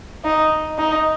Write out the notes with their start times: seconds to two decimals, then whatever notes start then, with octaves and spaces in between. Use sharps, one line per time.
0.25 D#4
0.79 D#4